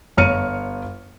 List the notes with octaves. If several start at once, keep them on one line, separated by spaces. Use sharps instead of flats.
G1 C#5 F6 C#7 D#7